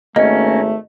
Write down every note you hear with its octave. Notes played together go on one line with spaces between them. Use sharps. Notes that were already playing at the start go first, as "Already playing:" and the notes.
G#1 A3 A#3 C#4 D#5